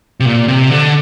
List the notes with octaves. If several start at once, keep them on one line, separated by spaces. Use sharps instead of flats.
C3
A#2
C3
D3